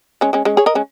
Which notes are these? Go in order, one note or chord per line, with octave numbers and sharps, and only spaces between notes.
G#3 C#4
G#3 C#4
G#3 C#4
G#4 C#5
A#4 D#5
G#3 C#4